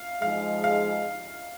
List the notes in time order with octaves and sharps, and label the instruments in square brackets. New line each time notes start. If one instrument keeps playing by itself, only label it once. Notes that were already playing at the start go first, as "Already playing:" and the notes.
Already playing: [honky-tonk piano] F5
[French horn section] F3 G#3 D#4 G#4 [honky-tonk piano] F5
[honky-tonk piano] F5